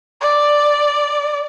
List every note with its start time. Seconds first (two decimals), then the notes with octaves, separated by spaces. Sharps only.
0.21 D5